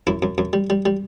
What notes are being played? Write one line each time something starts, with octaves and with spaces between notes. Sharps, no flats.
F#2 E4
F#2
F#2
G3
G3
G3